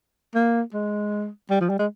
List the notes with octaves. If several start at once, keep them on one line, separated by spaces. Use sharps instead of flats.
A#3
G#3
G3
F3
G3
G#3